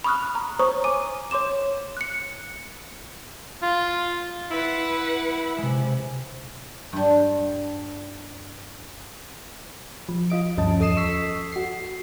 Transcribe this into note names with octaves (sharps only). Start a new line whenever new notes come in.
B5 C#6 D#6 F6 F#6
A#5
C5 C#5 A#5 C#6 D#6
G#5 D6 D#7
C#5 C6 D6 E7
F#6 C#7
F4
E4 B4 F#5
C3 G#3
G2 G3
F3
F4 D#5 D7
D2 G2 F3 C#4 D#5 A5
E2 A4 D#5 D#6 C7 E7
C#6 E6 B6 C7
F#4 C7